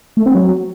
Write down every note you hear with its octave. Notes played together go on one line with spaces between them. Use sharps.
A3
C4
F#3